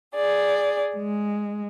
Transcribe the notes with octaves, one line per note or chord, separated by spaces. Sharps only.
G#4 D5
G#3